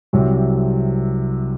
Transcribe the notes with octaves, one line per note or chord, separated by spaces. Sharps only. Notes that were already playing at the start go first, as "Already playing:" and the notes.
C2 C3 F#3 C4